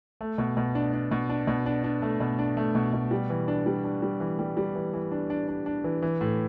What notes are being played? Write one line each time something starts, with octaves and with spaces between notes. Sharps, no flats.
A3
B2
B2
D4
D4
B2
D4
B2
D4
D4
A3
B2
D4
A3
B2
B2
G3
E3
D4
G3
D4
G3
E3
G3
G3
E3
E3
D4
D4
D4
D4
E3
E3
A2